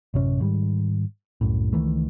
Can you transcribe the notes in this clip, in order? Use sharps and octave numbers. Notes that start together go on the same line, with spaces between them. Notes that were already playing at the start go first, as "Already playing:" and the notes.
A1 F#2 C3 C#4
G#2 D#3 G3
C2 F#2 A2
C#2 D#3 E3 A3